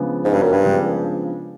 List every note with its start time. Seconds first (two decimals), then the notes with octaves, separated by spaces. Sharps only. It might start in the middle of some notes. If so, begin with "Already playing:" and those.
Already playing: C#3 F3 G#3 B3 D4
0.24 G#2
0.34 G2
0.42 F#2
0.52 G2
0.64 C#3 F3 G#3 B3 D4